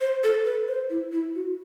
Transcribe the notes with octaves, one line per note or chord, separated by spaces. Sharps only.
C5
A4
B4
C5
E4
E4
F#4